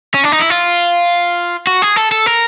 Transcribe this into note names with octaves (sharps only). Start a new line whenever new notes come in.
C#4
D4
D#4
E4
F4
F#4
G#4
A4
A4
A#4